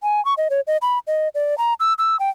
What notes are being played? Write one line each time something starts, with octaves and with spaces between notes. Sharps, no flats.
G#5
C#6
D#5
C#5
D#5
B5
D#5
D5
A#5
E6
E6
G5